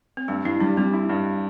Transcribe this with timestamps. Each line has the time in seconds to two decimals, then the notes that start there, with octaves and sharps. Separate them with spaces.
0.17 C4
0.28 G2 A3
0.45 G2 E4
0.60 G3 D4
0.77 G3 C4
0.93 E4
1.09 G2